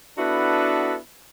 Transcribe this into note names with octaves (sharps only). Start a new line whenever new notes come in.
B3 D4 E4 F#4 A4 B4